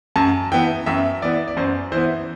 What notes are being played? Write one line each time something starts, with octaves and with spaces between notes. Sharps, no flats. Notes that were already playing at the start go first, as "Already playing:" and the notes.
F#2 A5
E3 B3 G5
F#2 E5
E3 B3 D5
D5
F#2 C5
E3 B3 C5